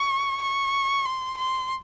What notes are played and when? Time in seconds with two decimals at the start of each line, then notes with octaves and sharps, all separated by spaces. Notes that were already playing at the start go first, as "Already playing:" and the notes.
Already playing: C#6
0.41 C#6
1.05 C6
1.37 C6